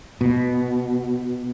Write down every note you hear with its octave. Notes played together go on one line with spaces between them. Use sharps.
B2